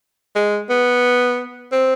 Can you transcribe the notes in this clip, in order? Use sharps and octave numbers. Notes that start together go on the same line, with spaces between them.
G#3
B3
C4